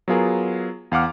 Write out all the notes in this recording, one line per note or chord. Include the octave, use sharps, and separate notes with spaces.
F#3 B3 F4 G#4 A#4
E2 F5 F#5 D6 F6